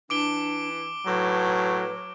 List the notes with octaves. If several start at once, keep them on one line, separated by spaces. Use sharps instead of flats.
E3 D4 D6 D7 G7
A2 F#3 B4